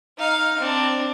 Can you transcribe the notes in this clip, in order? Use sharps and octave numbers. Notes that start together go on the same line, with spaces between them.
D#4 F5
C4 D4